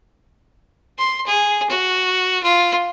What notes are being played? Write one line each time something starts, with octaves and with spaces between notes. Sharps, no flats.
C6
G#4
F#4
F4